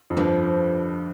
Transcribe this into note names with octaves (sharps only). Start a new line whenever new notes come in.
F2
G2 D3 F3